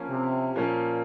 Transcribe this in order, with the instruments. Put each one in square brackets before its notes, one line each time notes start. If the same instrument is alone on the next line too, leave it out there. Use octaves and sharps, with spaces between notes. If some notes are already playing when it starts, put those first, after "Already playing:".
Already playing: [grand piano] F3 A#3 C#4
[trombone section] C3
[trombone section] A#2 [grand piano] F3 A#3 C#4